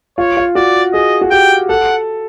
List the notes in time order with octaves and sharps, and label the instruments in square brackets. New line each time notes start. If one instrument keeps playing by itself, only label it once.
[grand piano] F4 [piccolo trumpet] C#5
[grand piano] F4
[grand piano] F#4 [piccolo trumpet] D5
[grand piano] G#4 [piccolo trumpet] D#5
[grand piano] F#4
[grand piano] G4 [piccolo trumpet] G5
[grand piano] A4 [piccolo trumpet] F#5